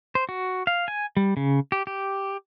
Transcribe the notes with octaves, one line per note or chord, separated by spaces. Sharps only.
C5
F#4
F5
G#5
G3
C#3
G4
G4